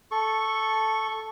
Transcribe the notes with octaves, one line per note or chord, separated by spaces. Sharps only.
A4 C#6